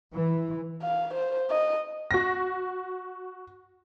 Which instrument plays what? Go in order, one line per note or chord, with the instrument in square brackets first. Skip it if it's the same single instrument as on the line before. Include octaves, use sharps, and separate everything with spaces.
[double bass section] E3
[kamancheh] F5
C5
D#5
[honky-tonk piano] F#4 A#6